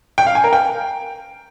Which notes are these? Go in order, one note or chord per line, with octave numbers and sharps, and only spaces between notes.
G5
F5
G#5
A#4
G5